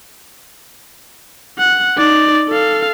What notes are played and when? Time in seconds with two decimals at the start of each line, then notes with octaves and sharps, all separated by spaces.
1.58 F#5
1.98 D#4 D5
2.48 A4 F5